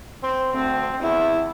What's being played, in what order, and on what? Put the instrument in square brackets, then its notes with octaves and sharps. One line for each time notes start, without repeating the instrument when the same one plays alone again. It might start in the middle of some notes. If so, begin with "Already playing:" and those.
[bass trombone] C4
[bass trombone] D2 [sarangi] C4
[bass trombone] E2 [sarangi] E4